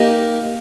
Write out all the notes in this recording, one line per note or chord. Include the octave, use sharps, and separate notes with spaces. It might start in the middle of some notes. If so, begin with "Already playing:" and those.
Already playing: A#3 D#4 G4 A#4 D#5